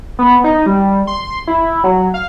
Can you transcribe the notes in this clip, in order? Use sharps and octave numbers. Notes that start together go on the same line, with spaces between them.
B3
D#4
G3
C6
E4
F#3
F5